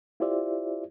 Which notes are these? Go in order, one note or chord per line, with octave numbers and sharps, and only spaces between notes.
E4 F4 G4 C5 D5 E5